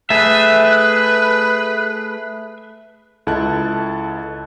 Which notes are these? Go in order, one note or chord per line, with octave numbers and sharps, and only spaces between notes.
A3 G#4 B4 E5 F#6
C#2 E4 A4 D#5 A5 F#6